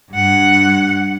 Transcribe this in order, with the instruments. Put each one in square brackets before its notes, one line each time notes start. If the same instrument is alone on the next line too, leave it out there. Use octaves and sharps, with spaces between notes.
[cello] G2 F#5